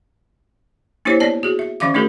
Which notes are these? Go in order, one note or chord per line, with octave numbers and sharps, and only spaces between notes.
A#3 D4 E4 G4 C5 C#5
B3 C#5 D5 A5
F#4 G#4
E5
D#3 E3 C#4 E5 F5 D6
A3 D4 D#4 F#4 G#4 A#4